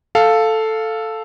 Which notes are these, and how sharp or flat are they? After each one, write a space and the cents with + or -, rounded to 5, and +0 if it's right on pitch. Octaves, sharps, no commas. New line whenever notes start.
A4 +0 F5 +0